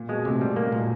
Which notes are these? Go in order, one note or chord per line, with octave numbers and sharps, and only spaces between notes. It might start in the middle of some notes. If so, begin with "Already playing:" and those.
Already playing: A#2
B2 G#3
A2 C3
G#2 G3
A#3
A2
A#2